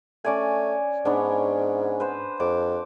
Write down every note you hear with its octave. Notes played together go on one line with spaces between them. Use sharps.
A3 C#4 D5 G#5
G#2 B3 C#4 D4
B4 C5
F2 D6